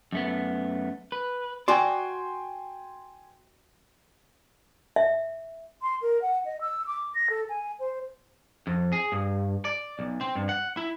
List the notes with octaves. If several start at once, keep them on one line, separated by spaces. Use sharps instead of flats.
F#2 A3 B3
B4
F#4 D5 G5 G#5 C6
E5
C6
A#4
F#5
D#5
E6
D6
A#6
A4
G#5
C5
F2
G#4
G2
D5
B1
C4
G2
F#5
E4